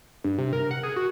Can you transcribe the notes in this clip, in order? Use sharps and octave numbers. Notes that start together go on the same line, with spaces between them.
G2
C3
A#4
F#5
G#4
F#4